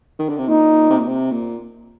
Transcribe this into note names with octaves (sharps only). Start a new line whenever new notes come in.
D#3
D3
C3
A#2 D#4
C3
A#2
C3
A#2